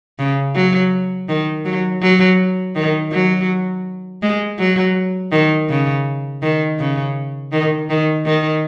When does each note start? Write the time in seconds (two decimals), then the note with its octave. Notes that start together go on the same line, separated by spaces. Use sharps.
0.19 C#3
0.55 F#3
1.29 D#3
1.65 F#3
2.02 F#3
2.75 D#3
3.12 F#3
4.22 G#3
4.59 F#3
5.32 D#3
5.69 C#3
6.42 D#3
6.79 C#3
7.52 D#3
7.90 D#3
8.26 D#3